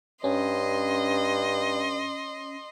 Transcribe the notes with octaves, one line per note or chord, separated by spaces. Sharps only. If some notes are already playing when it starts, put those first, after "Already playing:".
G2 C#4 D#5 C6